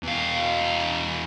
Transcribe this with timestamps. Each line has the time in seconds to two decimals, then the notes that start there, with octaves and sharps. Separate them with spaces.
0.03 E2 F5